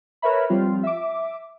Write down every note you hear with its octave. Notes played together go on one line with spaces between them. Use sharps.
A#4 B4 C#5 E5 B5
F3 G3 C4 F4
E5 D6